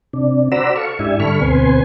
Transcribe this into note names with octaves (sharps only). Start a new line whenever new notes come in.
C3 D4
F#4 C5 D5 A#5 B5 E6
A4 F5 C#6
G#2 D4 E4 G4 E5 G#5
G2 D3 A4 B5 C#6 F6
D2 B2 C4 B4 G#5 C6